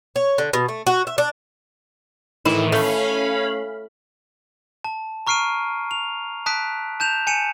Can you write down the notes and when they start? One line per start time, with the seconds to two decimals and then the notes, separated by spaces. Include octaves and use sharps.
0.16 C#5
0.38 D3
0.53 B2
0.69 A3
0.87 F#4
1.07 E5
1.18 D4
2.45 A2 D#3 E3 E4
2.72 A3 C#4 F5 B5
4.84 A5
5.27 A#5 C#6 F6 C7 D7 D#7
5.91 F7
6.46 A5 D#6 F#6 B6 D7
7.00 A5 G6 E7 F7
7.27 G#5 C#7 D#7 E7